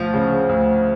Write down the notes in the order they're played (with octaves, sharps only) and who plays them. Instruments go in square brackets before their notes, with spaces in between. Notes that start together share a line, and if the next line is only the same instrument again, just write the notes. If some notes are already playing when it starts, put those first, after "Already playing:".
Already playing: [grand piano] D2 [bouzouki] F3
[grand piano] C#3
D2